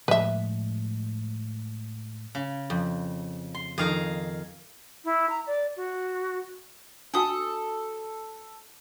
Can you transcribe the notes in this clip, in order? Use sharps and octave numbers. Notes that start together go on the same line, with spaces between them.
A2 F3 G#3 B4 E5
C#3
F2
C6
F2 D#3 G#4 F5 A#5
E4
A#5
D5
F#4
D4 F#4 A4 G#5 D#6